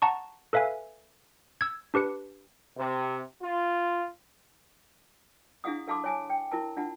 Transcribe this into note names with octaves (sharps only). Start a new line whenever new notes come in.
F#5 A5 A#5 C#6
A4 B4 E5 F5 G#5
E6 G#6
D4 G4 B4 C#7
C3
F4
D4 E4 G#4 F5 F#5 D#6
A4 F5 A5 C6 D6
C#5 G#5 A5
G5
E4 A#4 A5
D4 F4 F#5 A5